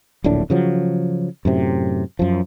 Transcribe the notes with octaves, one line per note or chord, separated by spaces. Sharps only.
D1 A#1 A2 D4
C#3 F3 F#3
F#2 A2 C3
F#2 F3